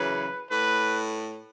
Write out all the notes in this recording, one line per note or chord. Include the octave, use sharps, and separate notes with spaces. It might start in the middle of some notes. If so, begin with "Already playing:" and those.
Already playing: F#2 C#3 E3 B4
A2 B4